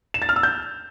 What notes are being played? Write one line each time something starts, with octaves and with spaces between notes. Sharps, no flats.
E7
A6
F6
E6
G6